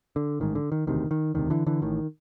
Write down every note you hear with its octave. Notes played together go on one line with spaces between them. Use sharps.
D3
A1 G#2 D#3
D3
D#3
E1 D2 C3 D#3
D#3
E1 D2 C3 D#3
D3 E3
D3 E3
A1 A2 D#3